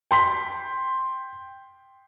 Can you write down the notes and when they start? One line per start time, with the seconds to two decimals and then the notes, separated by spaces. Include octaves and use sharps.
0.11 G5 C6 B6